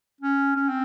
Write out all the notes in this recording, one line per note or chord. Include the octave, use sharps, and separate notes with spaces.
C#4
C#4
C4